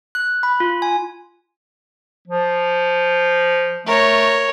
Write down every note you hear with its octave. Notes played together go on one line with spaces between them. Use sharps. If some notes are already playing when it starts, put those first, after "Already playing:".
F#6
B5
F4
G#5
F3
A3 A#4 C#5